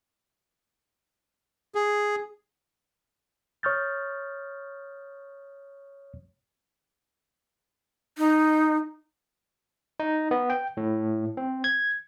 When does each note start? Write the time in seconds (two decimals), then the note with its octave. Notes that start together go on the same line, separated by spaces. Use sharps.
1.75 G#4
3.63 C#5 C#6 D#6 F6 G6 A6
8.18 D#4
10.00 D#4
10.31 B3
10.50 G5
10.77 A2
11.37 C4
11.64 G#6